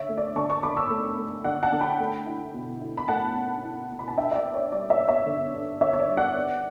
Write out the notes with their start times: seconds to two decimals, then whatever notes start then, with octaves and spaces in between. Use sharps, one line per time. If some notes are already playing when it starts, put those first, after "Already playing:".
Already playing: D3 C#5 E5
0.09 A3
0.17 D5
0.36 D3 A5 C#6
0.50 A5 C#6
0.63 D3 B5 D6
0.77 C#6 E6
0.90 A3
1.18 A3
1.44 D3 D5 F#5
1.63 F#5 A5
1.72 D3
1.81 G5 B5
2.00 A3
2.26 E4
2.54 B2
2.81 E4
2.97 B5
3.08 A3 F#5 A5
3.36 C#4
3.63 E4
3.91 B2
3.99 B5
4.08 A5
4.17 D4 E5 G5
4.32 E5
4.35 D5
4.45 B3
4.54 C#5
4.72 G3 D5
4.90 C#5 E5
4.99 B3
5.08 C#5 E5
5.26 D3
5.54 D4
5.81 D3 C#5 E5
5.93 C#5
5.99 D5
6.08 G3
6.17 D5 F#5
6.36 B3